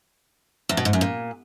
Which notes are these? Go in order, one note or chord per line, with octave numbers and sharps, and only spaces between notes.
E2
B2
G#2
F#2
A#2